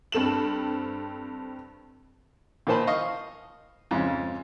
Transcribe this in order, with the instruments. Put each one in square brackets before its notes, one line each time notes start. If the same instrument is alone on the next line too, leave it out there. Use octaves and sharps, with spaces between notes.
[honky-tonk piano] G2 C4 A4 E7 F#7
[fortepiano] A#2 D#3 A#3 C5 A5 B5
D#5 F5 C#6
F2 G#2 C#3